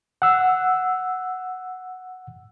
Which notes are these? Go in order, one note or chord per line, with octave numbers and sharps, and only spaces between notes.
F#5 E6